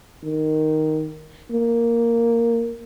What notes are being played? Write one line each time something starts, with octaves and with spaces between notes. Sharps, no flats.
D#3
A#3